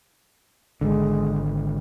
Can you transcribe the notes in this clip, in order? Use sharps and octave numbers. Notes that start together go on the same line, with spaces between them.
G#1 D3 G#3